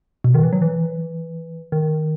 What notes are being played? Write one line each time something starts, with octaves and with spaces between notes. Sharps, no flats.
B2
D#3
E3
F#3
E3
D#3